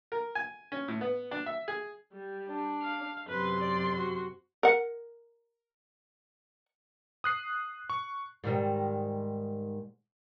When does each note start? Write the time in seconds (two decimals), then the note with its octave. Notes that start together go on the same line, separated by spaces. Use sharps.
0.12 A#4
0.35 G#5
0.72 C#4
0.88 A2
1.01 B3
1.31 D4
1.46 E5
1.68 G#4
2.13 G3
2.47 D4
2.82 F5
3.29 F#2 C3 B4 C6
3.60 D5
3.95 F#4
4.63 A#4 F#5
7.24 D#6 F#6 C7
7.90 C#6
8.44 G#2 D#3 G3